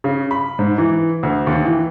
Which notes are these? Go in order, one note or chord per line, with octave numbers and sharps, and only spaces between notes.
C#3
B5
G#2
E3
D2
D#2
E3